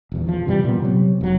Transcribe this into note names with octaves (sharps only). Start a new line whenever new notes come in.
D#1 E2
E2 F3
F#2 C3 E3 G3
A#2 B3
C3 F#3
F1 F#3